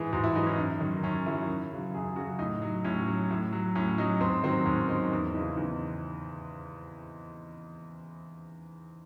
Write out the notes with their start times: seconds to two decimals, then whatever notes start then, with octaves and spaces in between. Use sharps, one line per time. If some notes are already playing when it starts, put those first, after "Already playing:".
Already playing: G#2 E3 G#4
0.13 G#2 F#4
0.23 E4
0.35 E3 D#4
0.46 C#4
0.57 F#2
0.80 D#3 F#3
1.03 F#2 C#4
1.26 D#3 F#3 E4
1.48 F#2
1.71 C#3 F#3
1.94 F#2 G#4
2.16 C#3 F#3 F#4
2.39 A2 D#4
2.62 F#3
2.84 A2 C#4
3.07 F#3
3.31 A2
3.52 F#3
3.75 A2 C#4
3.98 F#3 D#4
4.20 G#2 C4
4.43 D#3 F#3 C4
4.66 G#2 C#4
4.88 D#3 F#3 D#4
5.12 E2
5.34 C#3 E3 D#4
5.57 E2 D#4